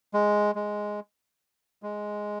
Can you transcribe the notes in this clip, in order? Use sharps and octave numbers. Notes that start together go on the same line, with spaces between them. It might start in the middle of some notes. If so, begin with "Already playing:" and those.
G#3
G#3
G#3